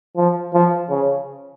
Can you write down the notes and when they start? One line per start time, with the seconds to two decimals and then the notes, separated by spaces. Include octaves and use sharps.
0.17 F3
0.53 F3
0.90 C#3